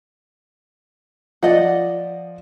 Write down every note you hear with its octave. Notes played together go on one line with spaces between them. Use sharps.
F3 D5 D#5 F#5